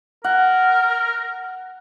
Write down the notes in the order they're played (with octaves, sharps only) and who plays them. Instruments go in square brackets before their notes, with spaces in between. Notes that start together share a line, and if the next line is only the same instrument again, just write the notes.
[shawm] A#4 [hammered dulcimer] F#5